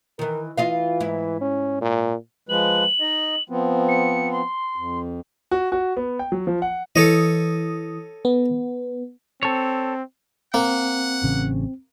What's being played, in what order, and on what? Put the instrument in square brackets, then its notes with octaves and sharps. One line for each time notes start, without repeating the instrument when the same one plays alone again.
[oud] D#3 E3 [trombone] A#4
[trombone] E3 [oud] F4 D#5 F5
[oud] G#2 E4
[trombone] C#4
A#2
[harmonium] F3 G#3 B4 [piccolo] F#7
[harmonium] D#4 D#5
F3 B3 C4
[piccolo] C#7
C6
[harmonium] F2
[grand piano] F#4
F#4
B3
G5
F#3
F3
F#5
[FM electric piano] E3 D#6 [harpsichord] A4 C#5 D#5
[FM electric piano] B3
[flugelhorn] C4 [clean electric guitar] A4 C#5
[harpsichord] A#3 [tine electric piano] C4 [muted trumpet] F#5
[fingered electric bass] A1 C#3